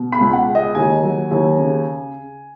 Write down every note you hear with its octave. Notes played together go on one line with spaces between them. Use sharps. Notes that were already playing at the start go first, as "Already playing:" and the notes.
Already playing: B2
B5
C#2
F#5
G#3
D#5
D#2 G#5
F#3
D#2
C#3